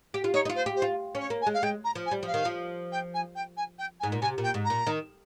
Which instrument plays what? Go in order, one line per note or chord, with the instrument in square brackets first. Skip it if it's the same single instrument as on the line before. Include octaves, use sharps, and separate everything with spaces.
[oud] G4
F4
[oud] D#4 [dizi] C#5
[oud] D#4
F4
[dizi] C5
[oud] G4
[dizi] C5
[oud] F4
C#4
[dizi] C#5
[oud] A#3
[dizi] G#5
[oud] G#3
[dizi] F5
[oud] G#3 [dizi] G5
[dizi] A#5
[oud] F3
[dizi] G#5
[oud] G3
[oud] F3 [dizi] F5
[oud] D#3
F3
[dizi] G5
G#5
G5
G#5
G5
G#5
[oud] G#2
A#2
[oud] C3 [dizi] G#5
[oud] A#2
[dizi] G5
[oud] G#2
[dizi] A#5
[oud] A#2
D#3